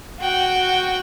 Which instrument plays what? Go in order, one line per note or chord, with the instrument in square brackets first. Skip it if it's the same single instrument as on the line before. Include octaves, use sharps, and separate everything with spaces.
[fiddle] F#4 G5